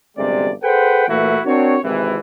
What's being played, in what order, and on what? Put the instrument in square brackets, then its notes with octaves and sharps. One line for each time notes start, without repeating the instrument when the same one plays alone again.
[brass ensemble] G1 F#2 C3 G#3 D5
G#4 A4 B4 C5 F#5 G5
A#2 E3 A3 A#3 E4 F#4
C4 D4 F#4 A#4 C#5
G#1 C3 E3